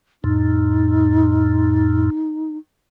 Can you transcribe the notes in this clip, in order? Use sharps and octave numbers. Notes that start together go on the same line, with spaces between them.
F2 A2 D#4